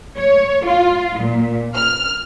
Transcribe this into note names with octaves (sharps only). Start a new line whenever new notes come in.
C#5
F4
A#2
F6